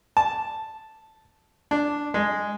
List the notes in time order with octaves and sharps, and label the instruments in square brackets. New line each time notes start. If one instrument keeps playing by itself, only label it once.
[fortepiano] A5
D4
G#3